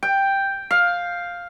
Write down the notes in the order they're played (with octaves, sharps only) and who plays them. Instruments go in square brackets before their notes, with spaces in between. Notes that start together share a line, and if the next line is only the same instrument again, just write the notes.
[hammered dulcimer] G5
F5